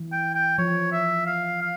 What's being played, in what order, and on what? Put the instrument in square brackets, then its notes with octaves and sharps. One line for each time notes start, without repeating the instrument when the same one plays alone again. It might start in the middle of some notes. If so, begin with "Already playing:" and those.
Already playing: [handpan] E3
[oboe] G5
G5
[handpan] F3 [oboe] C#5
[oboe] E5
F5
F5